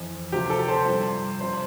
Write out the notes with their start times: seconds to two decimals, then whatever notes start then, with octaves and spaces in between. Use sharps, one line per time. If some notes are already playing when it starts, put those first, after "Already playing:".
Already playing: F2 E3
0.32 D2 C3 F3 G4
0.50 A4
0.68 C5
0.86 G2 F3
1.40 C3 F3 C5